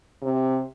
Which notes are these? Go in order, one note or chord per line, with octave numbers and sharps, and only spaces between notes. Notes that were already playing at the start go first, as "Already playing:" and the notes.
C3